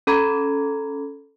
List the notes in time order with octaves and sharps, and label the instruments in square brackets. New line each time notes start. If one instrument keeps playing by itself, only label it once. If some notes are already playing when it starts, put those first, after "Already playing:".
[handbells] C#4 A4 A#5 B5 G#6